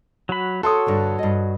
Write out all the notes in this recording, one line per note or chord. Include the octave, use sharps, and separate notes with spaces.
F#3 F#4 B5
F#4 A4 C#5 C6 D#6
G2 D3
G2 D#5